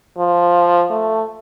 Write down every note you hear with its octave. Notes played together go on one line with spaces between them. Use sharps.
F3
A3